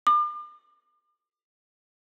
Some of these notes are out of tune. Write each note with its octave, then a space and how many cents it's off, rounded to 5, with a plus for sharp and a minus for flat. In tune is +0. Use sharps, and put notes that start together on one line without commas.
D6 +40